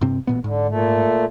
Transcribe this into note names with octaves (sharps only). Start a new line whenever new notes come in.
G2 C3 C4
A1 A#2 B3
G#2 D3
A#2 A3